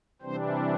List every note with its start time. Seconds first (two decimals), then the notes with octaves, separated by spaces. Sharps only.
0.22 C3 E3 G3 C4 D4 C5